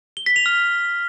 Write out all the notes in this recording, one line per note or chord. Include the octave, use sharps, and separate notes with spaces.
G7
B6
F7
F6